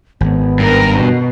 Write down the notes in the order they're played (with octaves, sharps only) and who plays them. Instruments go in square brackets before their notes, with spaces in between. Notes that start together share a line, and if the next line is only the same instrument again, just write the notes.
[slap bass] G#1 [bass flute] B3
[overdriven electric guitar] G2 [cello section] A#4
[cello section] B2